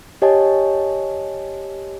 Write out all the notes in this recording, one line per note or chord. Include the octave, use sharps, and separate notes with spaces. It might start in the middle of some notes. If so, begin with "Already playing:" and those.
G4 C#5 D#5 G#5 A5